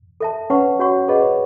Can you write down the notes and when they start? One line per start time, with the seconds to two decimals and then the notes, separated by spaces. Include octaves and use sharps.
0.20 A4 E5 A5
0.50 C#4 B4 C#5 F#5 A5 C#6
0.79 F#4 C#5 F#5 C#6
1.08 G#4 B4 D#5 F#5
1.22 C#5